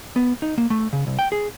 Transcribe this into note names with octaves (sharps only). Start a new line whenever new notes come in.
B3
D#4
A#3
A3
C#3
C2
G5
G#4